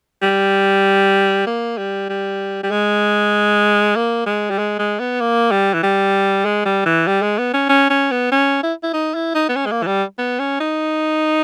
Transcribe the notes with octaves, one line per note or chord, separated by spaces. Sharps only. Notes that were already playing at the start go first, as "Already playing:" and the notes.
G3
A#3
G3
G3
G3
G#3
A#3
G#3
G3
G#3
G#3
B3
A#3
G3
E3
G3
G#3
G3
E3
G3
G#3
B3
C#4
C#4
C#4
B3
C#4
E4
E4
D#4
E4
D#4
B3
C#4
G#3
A#3
E3
G3
B3
C#4
D#4